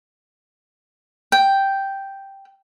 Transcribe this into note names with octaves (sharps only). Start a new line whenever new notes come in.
G5